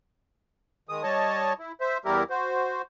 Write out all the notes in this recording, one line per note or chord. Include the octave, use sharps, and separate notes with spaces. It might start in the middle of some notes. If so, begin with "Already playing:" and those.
D#3 G#3 D#6
G3 C#5 D#5 A5
E4
C5 E5
E2 G3 E4 G4 A#4
F#4 C5